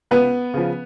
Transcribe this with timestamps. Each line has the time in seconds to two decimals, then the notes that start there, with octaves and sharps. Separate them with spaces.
0.11 C#2 B3 B4
0.54 C#3 F3